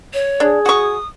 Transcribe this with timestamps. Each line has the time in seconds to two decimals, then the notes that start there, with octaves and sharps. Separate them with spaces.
0.13 C#5
0.40 D4 G#4
0.66 F#4 C#6 D#6